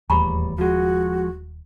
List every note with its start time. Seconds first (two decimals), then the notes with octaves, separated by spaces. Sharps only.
0.10 D#1 E2 A2 G3 A#5 B5 C#6
0.58 F3 G#3 F#4